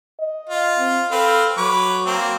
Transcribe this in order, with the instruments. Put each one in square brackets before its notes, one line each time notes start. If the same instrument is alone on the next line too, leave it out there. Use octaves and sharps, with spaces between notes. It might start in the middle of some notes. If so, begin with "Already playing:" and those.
[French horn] D#5
[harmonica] F4
[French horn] C4
[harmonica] C4 B4 F5 [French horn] A4
[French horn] F#3 [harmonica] B4 C#5 D6
[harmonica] A#3 C4